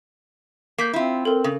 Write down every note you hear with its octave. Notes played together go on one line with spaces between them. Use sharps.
A#3 G6 B6 C7
C4 E4 F4
C4 A4 A#4
C#3